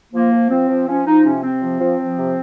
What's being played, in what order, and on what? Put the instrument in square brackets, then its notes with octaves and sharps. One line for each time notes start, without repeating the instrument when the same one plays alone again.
[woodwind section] F3 A#3
F3
F3 C4
F3
F3 C#4
F3 D#4
C3 C#4
C3 C4
F3
F3
F3
C3